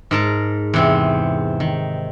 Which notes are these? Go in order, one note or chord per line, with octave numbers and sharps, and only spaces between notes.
G#2 A#4 A5
E2 C3 C4
D#3